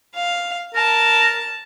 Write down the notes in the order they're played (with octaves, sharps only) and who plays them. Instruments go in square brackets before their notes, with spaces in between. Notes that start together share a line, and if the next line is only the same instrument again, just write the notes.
[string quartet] F5
[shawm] A#4 [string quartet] A5